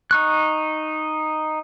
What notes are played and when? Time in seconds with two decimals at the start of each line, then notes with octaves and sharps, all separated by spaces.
0.11 D#4 C#6 F#6